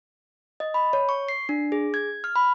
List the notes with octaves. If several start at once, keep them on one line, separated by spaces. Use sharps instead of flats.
D#5
B5
C#5
C#6
C7
D4
G#4
G#6
F6
B5